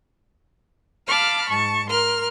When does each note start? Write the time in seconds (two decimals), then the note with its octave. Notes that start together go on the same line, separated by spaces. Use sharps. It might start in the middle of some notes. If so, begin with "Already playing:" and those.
1.08 F5 A5 B5 D6 F6
1.48 G#2 A5 C#6
1.89 A#4 C6 F6